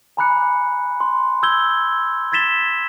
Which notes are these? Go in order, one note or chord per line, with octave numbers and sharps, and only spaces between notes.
G#5 A#5 B5 D6 F#6 C#7
C6
E6 G6 G#6 G7
E6 G#6 A6 B6 E7 G7